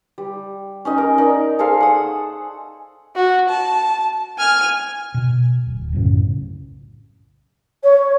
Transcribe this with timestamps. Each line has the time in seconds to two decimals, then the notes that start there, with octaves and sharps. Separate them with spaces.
0.18 G3
0.85 C#4 D#4 D#5
0.98 A#4
1.18 D#4 A#4 D5
1.59 G#4 A4 C5 F5
1.81 F#5 D#6
3.15 F#4
3.49 A5
4.38 G#5 F6
5.14 B2
5.66 D1
5.93 B1 F#2 A2 C#3
7.84 C#5